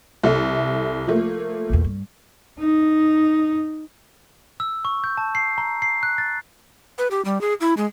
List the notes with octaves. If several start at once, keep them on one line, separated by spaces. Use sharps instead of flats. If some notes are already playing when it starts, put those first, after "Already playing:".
C2 A4 E5
F3 A3 A#3
B1 E2
G2
D#4
E6
C#6
G6
A5
C7
A#5
C7
F#6
A6
B4
G4
G3
G#4
E4
G#3